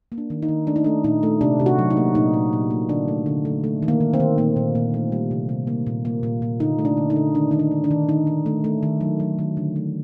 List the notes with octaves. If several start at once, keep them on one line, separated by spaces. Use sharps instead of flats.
A#3
D4
D#3
D#4
D#3
A3 D4
D#4
A3 D4
A#2 D#4
A3
C3 D4
C3
F#4
F#3
D#4
A#3
A#2 D#4
A#2
A#2
A#3
D3 D4
A3
D3
A3
A3
D#3
A#3
D#3
C4
D#3
A#2 A#3
A#2
A#2
A3
G3
C3
C3
A#3
A#2
A#3
A#2
A#2
D3 D#4
A3
D4
D3
D#4
D3
D#3 D4
D#3 D#4
D4
D#3
D4
D#3
D#3 D#4
D#3
A3
A3
D#3
F#3
F#3
D#3
D3
A3